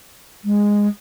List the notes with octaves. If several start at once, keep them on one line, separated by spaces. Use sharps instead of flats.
G#3